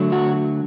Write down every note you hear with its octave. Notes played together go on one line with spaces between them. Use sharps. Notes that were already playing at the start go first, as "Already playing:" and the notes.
Already playing: D3 F#3 A3
F#4